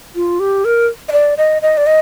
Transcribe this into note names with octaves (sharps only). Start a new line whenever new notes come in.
F4
G4
A#4
D#5
D5
D#5
D#5
D5
D#5